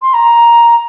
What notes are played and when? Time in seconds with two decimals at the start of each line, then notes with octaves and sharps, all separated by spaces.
0.02 C6
0.13 A#5